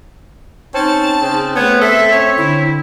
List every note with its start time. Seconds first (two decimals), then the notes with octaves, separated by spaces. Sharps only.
0.74 C4 C#4 D#4 A5
1.22 C#3 C4
1.56 A3 B3 C#5
1.81 A4 E5
2.12 C#4 C#5
2.37 D3 E4